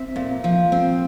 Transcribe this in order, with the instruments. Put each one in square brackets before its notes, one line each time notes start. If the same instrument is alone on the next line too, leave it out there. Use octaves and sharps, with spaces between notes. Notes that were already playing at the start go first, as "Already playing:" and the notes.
Already playing: [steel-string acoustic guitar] C4 E5
A#2
F3
C4